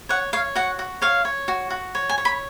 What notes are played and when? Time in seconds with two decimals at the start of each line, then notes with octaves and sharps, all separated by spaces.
0.09 C#5 F#5
0.33 C#5 F5
0.55 F#4 F#5
0.79 F#4
1.02 C#5 F5
1.25 C#5
1.48 F#4
1.70 F#4
1.95 C#5
2.09 G#5
2.18 C#5
2.25 B5